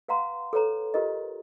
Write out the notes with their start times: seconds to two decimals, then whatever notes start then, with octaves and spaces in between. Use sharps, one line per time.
0.08 B4 F5 F#5 A#5 C6
0.53 A4 B4 C#5 A#5
0.94 F4 G4 A#4 B4 D#5